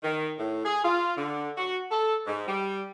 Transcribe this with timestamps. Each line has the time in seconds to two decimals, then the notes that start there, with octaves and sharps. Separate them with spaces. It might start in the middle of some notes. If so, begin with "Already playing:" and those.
0.04 D#3
0.38 A2
0.65 G#4
0.84 F4
1.18 D3
1.58 F#4
1.91 A4
2.27 G#2
2.48 G3